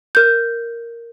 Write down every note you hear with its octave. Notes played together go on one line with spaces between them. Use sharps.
A#4 G6